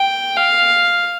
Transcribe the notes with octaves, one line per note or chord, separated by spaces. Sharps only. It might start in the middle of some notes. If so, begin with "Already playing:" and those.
Already playing: G5
F5